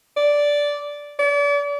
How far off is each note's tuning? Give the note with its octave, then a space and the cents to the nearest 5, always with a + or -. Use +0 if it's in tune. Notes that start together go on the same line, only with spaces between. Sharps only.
D5 -10
D5 -40